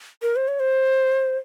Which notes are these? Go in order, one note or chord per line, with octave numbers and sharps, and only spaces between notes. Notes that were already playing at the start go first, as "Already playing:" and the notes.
A#4
C5
C#5
C5